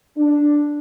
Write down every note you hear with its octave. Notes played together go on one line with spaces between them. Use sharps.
D4